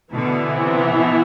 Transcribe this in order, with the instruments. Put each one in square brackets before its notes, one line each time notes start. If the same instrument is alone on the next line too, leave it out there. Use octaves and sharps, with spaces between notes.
[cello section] B2 D3 [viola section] E3 B3 E4
[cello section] C3
B2